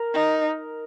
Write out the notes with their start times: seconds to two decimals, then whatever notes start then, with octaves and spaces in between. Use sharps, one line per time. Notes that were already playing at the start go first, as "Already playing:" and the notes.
Already playing: A#4
0.14 D#4